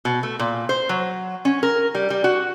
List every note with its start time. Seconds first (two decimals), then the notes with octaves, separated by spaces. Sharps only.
0.05 B2
0.23 A3
0.39 A#2
0.69 C5
0.89 F#3
1.45 C#4
1.63 A#4
1.95 G3
2.10 G3
2.24 F#4